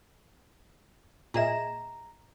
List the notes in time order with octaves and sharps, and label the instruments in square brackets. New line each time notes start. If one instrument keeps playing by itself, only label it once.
[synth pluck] A#2 G#4 E7 [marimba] F4 D#5 E5 [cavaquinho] A#5